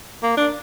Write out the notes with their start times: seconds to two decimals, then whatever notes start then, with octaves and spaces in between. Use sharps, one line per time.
0.23 A#3
0.37 D4